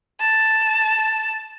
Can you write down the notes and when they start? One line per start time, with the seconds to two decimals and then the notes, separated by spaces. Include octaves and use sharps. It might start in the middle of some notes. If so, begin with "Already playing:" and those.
0.20 A5